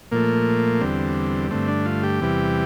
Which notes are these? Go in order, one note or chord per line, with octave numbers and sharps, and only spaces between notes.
A#2 F3 A3 A#3
E2 D3 G3 C4
G2 D3 A3 C4
D4
F4
G4
E2 C3 E3 G3